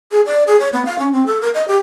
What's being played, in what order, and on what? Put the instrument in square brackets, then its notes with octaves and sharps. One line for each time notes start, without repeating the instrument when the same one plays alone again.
[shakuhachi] G#4
D5
G#4
C#5
B3
F5
C#4
C4
A4
A#4
D#5
G4